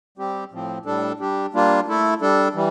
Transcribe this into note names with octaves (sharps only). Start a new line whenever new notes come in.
G3 C4 G4
A2 F3 C4
A2 G3 D4 A4
G3 D4 G4
G3 A#3 D4 F4
A3 E4 A4
G3 D4 A4
E3 G3